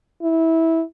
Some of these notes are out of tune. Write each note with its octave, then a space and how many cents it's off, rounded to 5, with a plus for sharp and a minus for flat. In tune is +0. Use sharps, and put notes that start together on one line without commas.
E4 -15